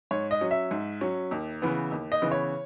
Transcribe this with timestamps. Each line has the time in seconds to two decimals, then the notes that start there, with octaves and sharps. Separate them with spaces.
0.11 G#2 C#5
0.31 D#5
0.41 F#3 C#4
0.51 E5
0.71 G#2
1.01 F#3 C#4
1.31 D#2
1.62 C#3 E3 B3
1.91 D#2
2.12 D#5
2.22 C#3 E3 B3
2.32 C#5